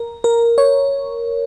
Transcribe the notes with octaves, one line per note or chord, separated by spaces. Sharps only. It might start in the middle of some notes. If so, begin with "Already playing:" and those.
Already playing: A#4
A#4
C#5